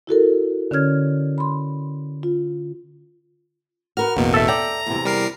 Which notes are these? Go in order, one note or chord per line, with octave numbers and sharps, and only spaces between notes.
E4 F#4 A4 A#4
D3 C#4 C#5 F6 G#6
B5 C6
F4
F#4 A#4 B4 F6
A1 E2 B2 A#3
A4 E5
D5 G5 A#5
E2 C3
G3 A#4 C7